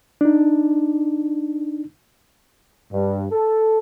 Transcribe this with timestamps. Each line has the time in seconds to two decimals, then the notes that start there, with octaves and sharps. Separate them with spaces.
0.21 D4 D#4
2.93 G2
3.32 A4